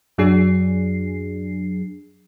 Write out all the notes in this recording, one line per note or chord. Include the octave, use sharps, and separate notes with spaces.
F#2 F#3 D4 G#4 C7